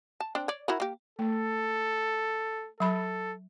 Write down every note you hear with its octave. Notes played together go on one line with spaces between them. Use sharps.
A5
C4 D4
C#5 D5
E4 F#4 A#4
A#3 G4
A3 A4
F#3 A4 B5